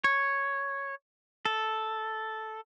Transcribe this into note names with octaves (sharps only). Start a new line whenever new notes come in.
C#5
A4